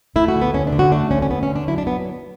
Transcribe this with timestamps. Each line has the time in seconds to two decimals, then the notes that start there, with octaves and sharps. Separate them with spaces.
0.16 A3 E4
0.28 F#4
0.35 D2
0.41 B3
0.54 D2 C#4
0.67 D4
0.72 D3
0.79 F#4
0.92 A3 D4
1.11 D2 C#4
1.22 C#4
1.30 D2 B3
1.43 C#4
1.49 D3
1.56 D4
1.68 F#3 E4
1.78 D4
1.87 B3